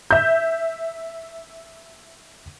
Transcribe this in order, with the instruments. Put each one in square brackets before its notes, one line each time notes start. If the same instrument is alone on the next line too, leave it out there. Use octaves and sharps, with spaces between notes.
[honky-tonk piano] E5 G6